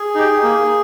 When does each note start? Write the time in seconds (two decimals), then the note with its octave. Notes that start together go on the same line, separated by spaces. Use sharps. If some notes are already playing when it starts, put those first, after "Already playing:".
Already playing: G#4
0.15 D#4 G4
0.43 A#3